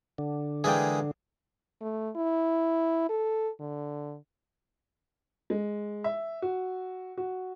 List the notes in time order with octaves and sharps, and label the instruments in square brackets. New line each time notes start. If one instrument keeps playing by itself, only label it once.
[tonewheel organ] D3
[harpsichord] E3 G#3 A#3 [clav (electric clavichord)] G#4 D5 G5
[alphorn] A3
E4
A4
D3
[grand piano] G#3
E5
F#4
F#4